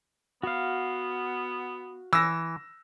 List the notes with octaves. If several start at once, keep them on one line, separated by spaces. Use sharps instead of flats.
B3 F#4 F5
E3 E6 A#6